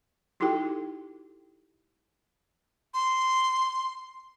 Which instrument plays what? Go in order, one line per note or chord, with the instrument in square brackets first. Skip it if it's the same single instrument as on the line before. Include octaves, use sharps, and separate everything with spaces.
[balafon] D#4 E4 F#4 G4 A4 G5
[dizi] C6